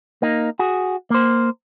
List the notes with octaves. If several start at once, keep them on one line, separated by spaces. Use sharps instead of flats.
A#3 D#4
F#4 G#4
A#3 C5